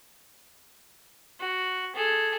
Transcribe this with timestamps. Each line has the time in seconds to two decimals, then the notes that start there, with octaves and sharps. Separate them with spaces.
1.40 F#4
1.95 G#4 A4